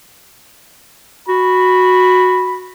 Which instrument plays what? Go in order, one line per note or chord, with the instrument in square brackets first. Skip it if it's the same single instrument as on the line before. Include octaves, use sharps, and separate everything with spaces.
[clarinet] F#4 [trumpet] B5